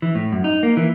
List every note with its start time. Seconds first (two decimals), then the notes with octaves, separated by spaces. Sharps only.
0.02 E3
0.15 A2
0.32 F#2
0.44 D#4
0.63 A#3
0.77 E3